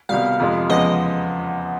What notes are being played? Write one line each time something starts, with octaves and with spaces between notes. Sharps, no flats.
C2 B2 G3 F5
F2 C3 F3 G#3
E2 C#3 F3 G#3 B3 D#5